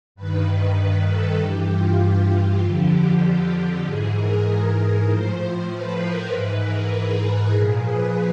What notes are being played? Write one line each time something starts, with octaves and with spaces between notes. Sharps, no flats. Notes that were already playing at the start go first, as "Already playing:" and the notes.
G2 D#3 B4
A4
G2 E3 G4
F4
G4
F2 D3 F3
G4
G4
G4
G#2 E3 G#4
A#4
A2 F3 C5
B4
A#4
G#2 E3 B4
A#4
G#4
A#2 F3
B4